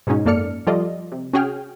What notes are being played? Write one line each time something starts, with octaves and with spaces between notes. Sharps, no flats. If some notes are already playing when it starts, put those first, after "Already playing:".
G#2 B2 G#3 C#4 D#4
F#2 A#3 A4 D5 F6 C#7
F3 G3 F4 A4 D5 D#5
C3
C#4 F#4 G#4 G5 F6